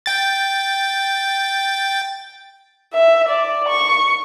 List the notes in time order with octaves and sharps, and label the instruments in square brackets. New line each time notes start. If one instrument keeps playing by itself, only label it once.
[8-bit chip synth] G5 A6
[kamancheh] E5
D5
C#6